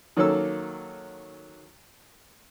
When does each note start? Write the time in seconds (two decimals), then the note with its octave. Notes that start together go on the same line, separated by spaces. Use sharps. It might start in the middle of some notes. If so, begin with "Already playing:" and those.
0.17 D#3 F#3 A#3 C#4 A4 E6